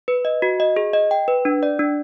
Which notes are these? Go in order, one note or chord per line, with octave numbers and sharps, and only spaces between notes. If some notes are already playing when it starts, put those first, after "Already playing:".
B4
D#5
F#4
D#5
G#4
D#5
G5
B4
D4
D5
D4